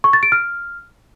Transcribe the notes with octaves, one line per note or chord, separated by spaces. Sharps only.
C#6
A6
D7
F6